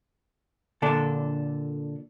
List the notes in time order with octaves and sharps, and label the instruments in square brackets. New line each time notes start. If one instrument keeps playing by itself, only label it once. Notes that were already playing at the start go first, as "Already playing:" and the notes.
[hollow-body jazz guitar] A#2 D3 D4 A4